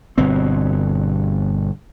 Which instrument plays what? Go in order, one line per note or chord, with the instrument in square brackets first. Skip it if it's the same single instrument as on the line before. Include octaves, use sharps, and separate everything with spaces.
[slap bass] G1 B2 C4